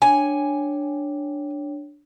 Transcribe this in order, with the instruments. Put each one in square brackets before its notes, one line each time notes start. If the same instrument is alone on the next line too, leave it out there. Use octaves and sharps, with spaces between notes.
[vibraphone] D4 C#5 G5 [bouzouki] G#5